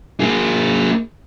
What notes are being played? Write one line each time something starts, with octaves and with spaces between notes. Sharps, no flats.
A#3 G#4